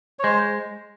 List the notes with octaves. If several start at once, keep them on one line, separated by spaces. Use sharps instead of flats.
C#5
G#3 C5